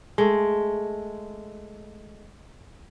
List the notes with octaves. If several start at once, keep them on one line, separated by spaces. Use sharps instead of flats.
G#3 A3